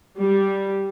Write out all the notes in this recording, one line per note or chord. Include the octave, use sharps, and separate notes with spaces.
G3